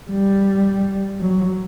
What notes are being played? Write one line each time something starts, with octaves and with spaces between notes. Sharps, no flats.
G3
F#3